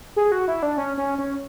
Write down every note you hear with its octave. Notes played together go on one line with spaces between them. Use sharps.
G#4
F#4
E4
D4
C#4
C#4
C#4